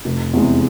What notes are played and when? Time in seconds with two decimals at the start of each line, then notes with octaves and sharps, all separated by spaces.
0.05 F1
0.33 E2 C3 E3 G#3